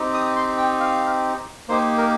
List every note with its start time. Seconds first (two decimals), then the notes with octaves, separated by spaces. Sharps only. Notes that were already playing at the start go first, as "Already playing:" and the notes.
Already playing: C4 D#4 G4
0.14 D#6
0.36 C6
0.58 G5
0.80 F5
1.68 A#3 D#4 G4 C5
1.98 A#4